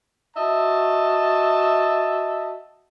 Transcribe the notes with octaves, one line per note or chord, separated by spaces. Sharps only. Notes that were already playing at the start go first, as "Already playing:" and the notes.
F#4 D#5 E5 A5